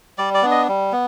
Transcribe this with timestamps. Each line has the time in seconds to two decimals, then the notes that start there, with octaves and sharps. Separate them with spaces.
0.18 G3 D5
0.34 D5
0.42 B3 D4
0.51 D#5
0.68 G3
0.92 B3